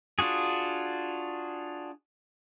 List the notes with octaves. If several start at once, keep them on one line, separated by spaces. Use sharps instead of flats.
D4 F4 F#4 G#4